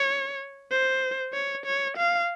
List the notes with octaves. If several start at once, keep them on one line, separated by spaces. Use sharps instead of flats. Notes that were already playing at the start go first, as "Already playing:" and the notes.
Already playing: C#5
C5
C#5
C#5
F5